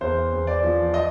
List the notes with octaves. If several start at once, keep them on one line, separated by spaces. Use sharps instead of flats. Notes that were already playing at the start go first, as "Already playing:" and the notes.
E2 C5
E2
D5
F3
D#5